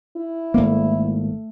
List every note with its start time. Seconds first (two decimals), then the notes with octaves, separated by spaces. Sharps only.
0.17 E4
0.54 G#1 A3 A#3